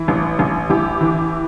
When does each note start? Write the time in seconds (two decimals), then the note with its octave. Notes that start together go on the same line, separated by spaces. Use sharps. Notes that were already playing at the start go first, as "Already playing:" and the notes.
Already playing: E3 E4
0.08 A1
0.39 A1
0.70 A1 E4 G4
1.01 E3